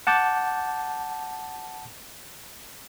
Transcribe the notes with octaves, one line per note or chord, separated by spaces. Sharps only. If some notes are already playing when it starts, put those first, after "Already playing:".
F#5 A5 D6 G6